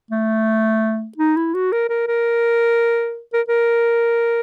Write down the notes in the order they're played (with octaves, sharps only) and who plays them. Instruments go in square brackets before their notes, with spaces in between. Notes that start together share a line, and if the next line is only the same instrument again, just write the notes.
[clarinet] A3
D#4
E4
F#4
A#4
A#4
A#4
A#4
A#4